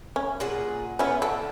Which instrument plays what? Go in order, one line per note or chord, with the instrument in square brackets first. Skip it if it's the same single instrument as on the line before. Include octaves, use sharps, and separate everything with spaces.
[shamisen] C#4
[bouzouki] A#2 G#4 F#5
[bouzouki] B3 F4 [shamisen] C#4 E4
[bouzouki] D3 [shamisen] A4